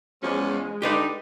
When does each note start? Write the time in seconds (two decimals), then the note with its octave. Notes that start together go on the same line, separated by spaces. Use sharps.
0.22 E2 F3 G#3 C#4
0.82 D3 D4 D#4 G4 B4 D5